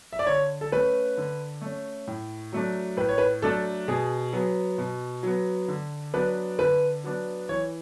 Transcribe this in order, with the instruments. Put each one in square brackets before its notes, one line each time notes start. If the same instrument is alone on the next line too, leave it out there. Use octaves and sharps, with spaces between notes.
[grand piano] E5
D5
[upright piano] D3 [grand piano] C#5
[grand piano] A4
[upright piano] A3 C#4 [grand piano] B4
[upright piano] D3
A3 C#4
A2
F#3 A3 D4
[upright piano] A2 [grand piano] B4
[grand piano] C#5
B4
[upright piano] F#3 A3 D4 [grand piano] A4
[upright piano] B2 [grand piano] G#4
[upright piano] F#3 B3
B2
F#3 B3
D3
[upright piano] F#3 B3 D4 [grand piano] B4
[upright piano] D3 [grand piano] B4
[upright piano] F#3 B3 D4
[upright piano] E3 [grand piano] C#5